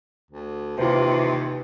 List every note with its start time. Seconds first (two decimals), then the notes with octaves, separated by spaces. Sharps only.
0.31 D2
0.78 D#2 C3 E3 F4 C5